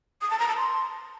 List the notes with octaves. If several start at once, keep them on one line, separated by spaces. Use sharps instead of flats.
D#6
A5
A#5
A5
C6